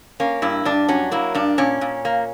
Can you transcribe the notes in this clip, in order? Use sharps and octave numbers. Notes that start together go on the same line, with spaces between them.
A#3 C#4
G2 E4
G2 D4
F#3 C#4
A#3 E4
G2 D4
A#2 C#4
A#2
A#3